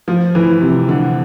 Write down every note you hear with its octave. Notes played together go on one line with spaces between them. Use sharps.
F3
E3
C3
D3